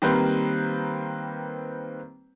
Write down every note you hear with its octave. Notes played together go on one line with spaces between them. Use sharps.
D#3 G3 A#3 C4 B4 C5